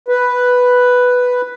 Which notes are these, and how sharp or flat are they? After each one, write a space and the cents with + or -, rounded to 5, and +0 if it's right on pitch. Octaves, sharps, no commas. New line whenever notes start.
B4 +0